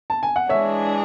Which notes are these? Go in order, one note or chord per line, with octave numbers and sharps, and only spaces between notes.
A5
G#5
F#5
E3 G#3 D4 G#4 C#5 E5